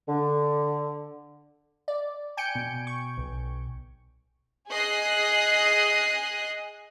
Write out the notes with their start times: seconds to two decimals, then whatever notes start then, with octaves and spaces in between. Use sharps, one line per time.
0.08 D3
1.88 D5
2.37 G5 G#5 G6 C#7 D7
2.55 B2
2.87 C#6
3.18 B1
4.70 G#4 D#5 F#6 C7